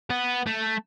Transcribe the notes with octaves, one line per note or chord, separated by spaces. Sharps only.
B3
A3